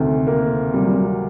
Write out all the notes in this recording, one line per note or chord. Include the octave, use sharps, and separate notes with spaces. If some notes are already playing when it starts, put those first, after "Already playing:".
Already playing: D2 C3 D#3 C4
A#3
G3
F#3
G3